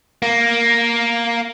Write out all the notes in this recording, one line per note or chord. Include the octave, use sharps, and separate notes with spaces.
A#3